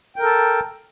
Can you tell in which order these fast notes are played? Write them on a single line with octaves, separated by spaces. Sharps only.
G5 A#4 A4 A5